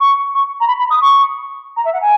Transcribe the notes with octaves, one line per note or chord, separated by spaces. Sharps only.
C#6
C#6
A#5
B5
B5
D#6
C#6
A#5
E5
F#5
G#5